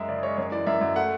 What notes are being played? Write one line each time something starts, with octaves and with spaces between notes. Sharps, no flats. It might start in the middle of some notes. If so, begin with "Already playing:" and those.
Already playing: F#2 G#3 E5
C#3 D5
G#3 C#5
F#2 C#5
E3 D5
F#2 E5
F#2
A3 F#5